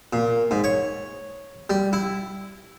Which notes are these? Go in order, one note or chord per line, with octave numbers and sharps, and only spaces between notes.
A#2
G#2
C#5
G3
E4